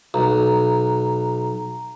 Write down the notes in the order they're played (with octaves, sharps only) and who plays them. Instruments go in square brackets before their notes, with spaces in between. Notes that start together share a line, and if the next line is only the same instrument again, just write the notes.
[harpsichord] B1 [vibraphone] A#5